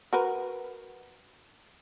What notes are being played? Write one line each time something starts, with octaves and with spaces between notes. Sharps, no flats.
F#4 A#4 B4